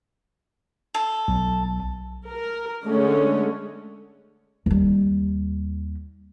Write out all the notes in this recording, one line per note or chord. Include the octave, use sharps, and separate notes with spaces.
A4
B1
A#4
D3 G#3 A3 C#4
D#2 G3